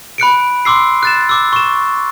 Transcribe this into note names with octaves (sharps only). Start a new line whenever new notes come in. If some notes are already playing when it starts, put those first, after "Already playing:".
B5 F#6 C#7 D7
C6 D6 E6 C7
F#6 A6 E7
D6 E6
C#6 E7